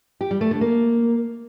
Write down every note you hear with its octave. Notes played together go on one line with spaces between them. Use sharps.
G4
G3
A3
D3
A#3